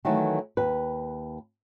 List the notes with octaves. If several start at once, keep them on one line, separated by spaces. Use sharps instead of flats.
D#3 E3 F#3 A3
D#2 B4